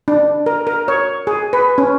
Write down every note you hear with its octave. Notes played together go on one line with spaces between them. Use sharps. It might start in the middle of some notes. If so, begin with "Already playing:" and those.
D4
A#4
A#4
C#5
G#4
B4
C#4